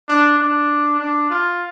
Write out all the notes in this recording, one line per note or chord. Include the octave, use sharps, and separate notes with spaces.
D4
D4
D4
F4